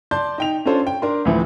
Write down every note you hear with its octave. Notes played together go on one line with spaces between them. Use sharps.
D5 A5 C6 G6
D#4 G5 F7
C#4 D4 F4 A4 C5 C#5
G5
D4 A#4 C6
D2 A2 E3 F3